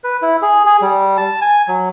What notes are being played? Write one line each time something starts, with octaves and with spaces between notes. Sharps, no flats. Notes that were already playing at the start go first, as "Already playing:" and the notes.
B4
E4
G#4
G#4
G3
A5
G#5
F#3